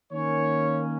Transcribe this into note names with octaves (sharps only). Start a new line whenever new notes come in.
D#3 A#3 C#4 C#5